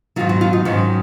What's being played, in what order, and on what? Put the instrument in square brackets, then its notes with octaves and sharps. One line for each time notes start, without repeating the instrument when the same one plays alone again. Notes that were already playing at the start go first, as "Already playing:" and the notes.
[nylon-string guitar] G#2 D#3 F#3 F4
F#4
F4
D#4
G#2 D#3 F#3 C#4